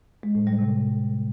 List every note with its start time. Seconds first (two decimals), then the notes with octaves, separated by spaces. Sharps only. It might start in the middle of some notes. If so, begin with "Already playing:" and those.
0.23 G#3
0.35 A2
0.47 G3
0.59 C3